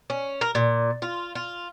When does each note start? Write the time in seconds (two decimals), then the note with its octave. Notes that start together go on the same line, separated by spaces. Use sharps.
0.10 C#4
0.41 A#4
0.55 A#2
1.02 F4
1.35 F4